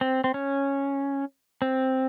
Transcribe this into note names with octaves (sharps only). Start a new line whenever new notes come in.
C4
C4
C#4
C4